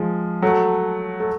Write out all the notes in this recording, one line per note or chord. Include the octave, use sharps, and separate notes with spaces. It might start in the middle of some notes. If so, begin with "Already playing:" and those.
Already playing: F3 G#3
F#3 A3
A3